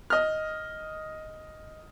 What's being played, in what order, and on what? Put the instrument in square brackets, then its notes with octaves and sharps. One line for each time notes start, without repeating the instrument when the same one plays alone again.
[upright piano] D#5 F6